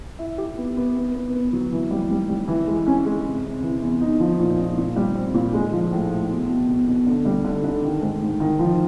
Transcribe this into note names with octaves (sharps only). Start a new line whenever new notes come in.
E4
G4
B3
B3
B3
B3
B3
F#3
E3
G3
G3
G3
E3
G#3
C#4
G#3
C3
C3
E3
E2
D#4
F3
A#2
A#2
A#2
G3
C4
A#2
G#3
F3
A2
A2
B2
B2
B2
B2
D3
G3
D3
D3
D#3
G#2
G#2
D#3
F3